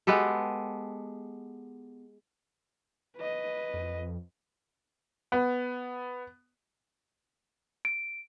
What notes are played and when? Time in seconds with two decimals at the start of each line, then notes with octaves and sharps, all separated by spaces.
0.07 G#3 B3 G4 A4
3.17 B4 D#5
3.74 F2
5.32 B3
7.85 D7